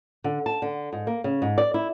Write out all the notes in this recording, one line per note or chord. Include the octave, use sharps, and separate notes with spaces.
D3
A5
D3
G#2
A#3
C#3
G#2
D5
E4